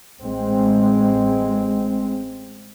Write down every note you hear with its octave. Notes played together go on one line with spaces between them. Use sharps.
A1 G#3 C4